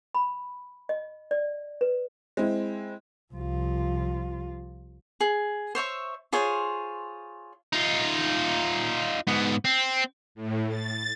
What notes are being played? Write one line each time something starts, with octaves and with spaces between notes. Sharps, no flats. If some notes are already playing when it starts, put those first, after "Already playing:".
B5
D#5
D5
B4
G#3 C4 E4
C2 F3 F4
G#4
C5 C#5 E5 C#6
F4 G#4 C5 C#5
D#4 F4
G#2 B3
C4
A2
A6